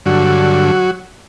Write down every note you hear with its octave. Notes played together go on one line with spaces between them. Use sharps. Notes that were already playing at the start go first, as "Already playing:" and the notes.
G2 D3 F#3 F#4